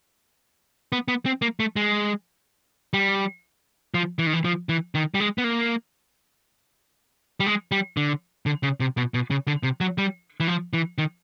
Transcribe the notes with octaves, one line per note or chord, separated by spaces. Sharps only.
B3
B3
C4
A#3
A3
G#3
G3
F3
E3
D#3
E3
F3
E3
D#3
G3
G#3
B3
A#3
G3
G#3
G3
D3
D3
C#3
C3
B2
B2
C#3
D3
C3
F#3
G3
E3
F3
E3
D#3